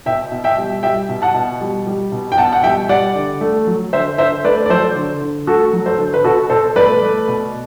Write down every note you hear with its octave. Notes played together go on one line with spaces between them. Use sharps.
B2 E5 G5
B2
E5 G5
G3
G3 E5 G5
B2
F#5 A5
B2
G3
G3
B2
G5
B2 F#5 A5
F#5
G3 E5 G5
G3 D5 F#5
D3
A3
F#3
D3 C5 E5
D3 C5 E5
A3 B4 D5
D5
F#3 A4 C5
D3
D3
A3 F#4 A4
F#3
A4 C5
D3
B4
B2 F#4 A4
B2 A4 C5
A3 B4 D5
A3
B2